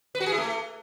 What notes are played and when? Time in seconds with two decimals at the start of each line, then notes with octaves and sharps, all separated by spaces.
0.15 B4
0.20 F#4
0.26 G#4
0.32 E4
0.38 A3